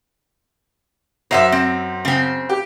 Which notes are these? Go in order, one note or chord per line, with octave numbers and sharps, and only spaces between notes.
F#2 C5 D#5 E5
C4
C#3 C4
G4